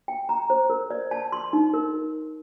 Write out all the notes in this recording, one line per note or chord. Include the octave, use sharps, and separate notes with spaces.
G5
A#5
C5
A#4
D5
A5
C6
D#4
A#4